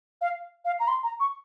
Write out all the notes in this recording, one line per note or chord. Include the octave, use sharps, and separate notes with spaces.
F5
F5
A#5
C6
A#5
C#6